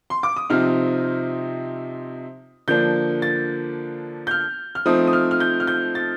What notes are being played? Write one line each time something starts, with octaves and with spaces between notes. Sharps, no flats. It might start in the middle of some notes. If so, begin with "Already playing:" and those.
C6
D6
D#6
C3 F3 C4 D#4 F6
D3 F3 A#3 D4 G6
A6
G6
F6
F6
F3 A3 C4 D#4 D#6
D#6
F6
F6
G6
F6
G6
A6